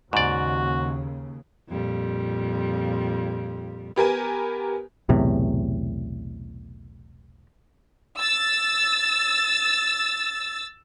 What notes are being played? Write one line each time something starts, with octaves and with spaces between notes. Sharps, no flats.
D#2 G#2 C#3 F#4 D5
F2 A#2 G3
B3 G4 A#4 G#5
B1 E2 A2 C3
E6 A6